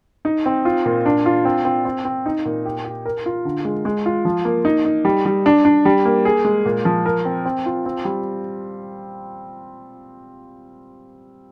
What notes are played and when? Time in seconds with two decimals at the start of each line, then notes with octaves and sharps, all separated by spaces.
0.25 D#4
0.46 C4
0.65 F4
0.86 A#2
1.06 D4
1.26 F4
1.45 C4
1.65 C4
1.85 C4
2.05 C4
2.26 D#4
2.45 A#2
2.65 G4
2.85 G4
3.05 A#4
3.26 F4
3.45 D3
3.65 G#3
3.85 G#3
4.06 F4
4.25 F3
4.45 A#3
4.65 D#4
4.85 D#4
5.05 G3
5.25 G3
5.46 D4
5.65 D4
5.85 G3
6.05 A#3
6.25 G#4
6.45 G#3
6.66 A#2
6.85 F3
7.06 A#4
7.25 C4
7.45 C4
7.66 F4
7.86 C4
8.05 G3